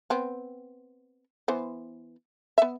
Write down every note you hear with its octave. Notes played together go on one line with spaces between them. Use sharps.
B3 C4
E3 B3 C5
B3 E5